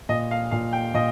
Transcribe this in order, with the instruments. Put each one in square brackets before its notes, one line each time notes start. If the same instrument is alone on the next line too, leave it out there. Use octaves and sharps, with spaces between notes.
[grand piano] A#2 [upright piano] D#5
[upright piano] F5
[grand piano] A#2 [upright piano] F5
[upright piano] G5
[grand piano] A#2 [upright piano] D#5